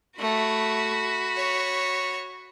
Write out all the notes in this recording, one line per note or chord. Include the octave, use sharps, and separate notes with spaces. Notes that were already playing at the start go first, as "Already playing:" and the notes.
A3 F#4 B5
C#5